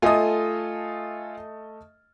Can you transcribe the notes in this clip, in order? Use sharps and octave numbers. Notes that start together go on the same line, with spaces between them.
A3 F4 A4 D#5 G#5 D#6